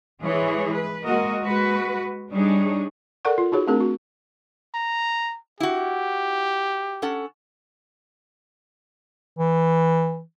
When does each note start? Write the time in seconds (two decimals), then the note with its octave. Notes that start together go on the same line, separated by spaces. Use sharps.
0.20 E3 G#3 G#4 C#5
0.74 B4
1.04 G#3 A#3 F#4 A#4 D#5
1.43 G#3 F#4 B4
2.31 G3 D4 D#4 G#4 C#5
3.25 A4 A#4 D5 F#5 C#6
3.38 F4
3.52 D#4 F#4 G#4 C#5
3.67 A3 C4 D4 G#4 A#4
3.80 F#4
4.74 A#5
5.60 E4 F#4 G4
7.02 C#4 A4 F#5
9.39 E3